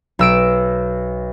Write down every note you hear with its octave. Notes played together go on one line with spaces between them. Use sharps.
B1 E6 D7